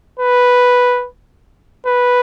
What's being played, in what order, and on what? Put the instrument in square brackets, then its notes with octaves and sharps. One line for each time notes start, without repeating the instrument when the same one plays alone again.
[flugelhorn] B4
B4